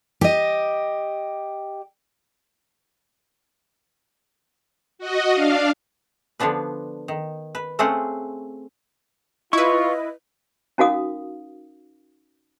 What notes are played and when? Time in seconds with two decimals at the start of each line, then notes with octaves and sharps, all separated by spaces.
0.21 G4 D#5
4.99 F#4 D#5
5.33 D4 F5
6.40 D3 F3 B3 D4 B4
7.08 D#3
7.55 B4
7.79 A3 C4 C#4 F4 G#4 F#5
9.53 E4 F4 B4 D#5 C#6
10.78 C#4 D#4 F#4 A#4 F5 D#6